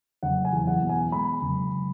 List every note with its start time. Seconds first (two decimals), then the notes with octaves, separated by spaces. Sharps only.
0.23 F#1 F#5
0.45 G#5
0.53 E2
0.67 F#5
0.82 B2
0.89 G#5
1.12 G#3 B5
1.42 F#1